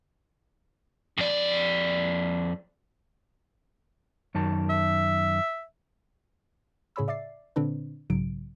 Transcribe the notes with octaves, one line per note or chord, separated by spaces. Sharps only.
F2 D5
F#2 D#3 A5
E5
A2 C#3 G#4 C#5 B5 E6
D5 E5 D6 A6 C7
A#2 D3 C4 D4 B4
B1 G#2 C#3 F#3 D7